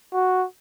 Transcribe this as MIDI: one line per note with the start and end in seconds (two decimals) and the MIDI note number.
0.14 0.45 66